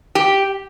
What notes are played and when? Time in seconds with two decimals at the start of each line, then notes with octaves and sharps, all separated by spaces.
0.15 G4